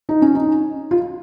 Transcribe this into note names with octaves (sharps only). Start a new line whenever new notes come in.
D#4
C#4
D#4
F4